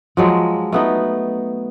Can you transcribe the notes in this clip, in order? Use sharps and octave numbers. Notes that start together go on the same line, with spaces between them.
F3 F#3 G#3
A3 B3 D#4